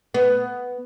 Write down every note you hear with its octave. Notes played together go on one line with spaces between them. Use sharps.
B3